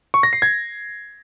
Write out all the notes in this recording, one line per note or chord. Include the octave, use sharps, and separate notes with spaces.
C#6
A#6
C7
G#6